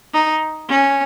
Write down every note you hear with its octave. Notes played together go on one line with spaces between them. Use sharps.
D#4
C#4